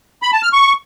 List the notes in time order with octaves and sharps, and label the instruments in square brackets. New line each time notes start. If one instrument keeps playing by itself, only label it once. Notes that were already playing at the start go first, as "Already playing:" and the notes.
[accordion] B5
A5
F6
C#6